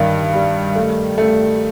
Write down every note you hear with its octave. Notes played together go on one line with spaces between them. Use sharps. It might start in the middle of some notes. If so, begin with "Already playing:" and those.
Already playing: G2 D#3
G3
A3
A3